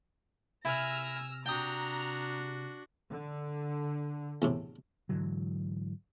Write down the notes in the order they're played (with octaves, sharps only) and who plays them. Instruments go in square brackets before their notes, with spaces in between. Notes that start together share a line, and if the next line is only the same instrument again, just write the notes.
[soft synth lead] C3 [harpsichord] E4 [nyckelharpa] G#5 [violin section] E6 F6 A#6
[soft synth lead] C3 [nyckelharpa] D4 F#4 [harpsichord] G5 D#6 [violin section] A#5
[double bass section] D3
[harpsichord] E2 A2 C3
[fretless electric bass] G#2 D3 E3 F#3